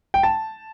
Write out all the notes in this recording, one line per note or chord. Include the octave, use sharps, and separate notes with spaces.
G5
A5